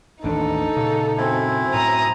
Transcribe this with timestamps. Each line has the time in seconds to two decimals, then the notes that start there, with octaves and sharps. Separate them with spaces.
0.24 A1 D#2 D4 D#4 A4
0.77 A#2 C#3
1.18 F#2 C4 E4
1.74 A2 A#5 D#6